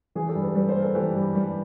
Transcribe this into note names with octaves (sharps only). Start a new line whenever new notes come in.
E3 G#4
G4 A4
G2
A4 B4
G3 A4 B4
A#4 C5
A#3
A4 B4
E3 G4 A4
G2
G3